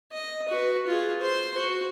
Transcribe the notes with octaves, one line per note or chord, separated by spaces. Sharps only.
D#5
F#4 B4
F4 G#4
C5 C6
F#4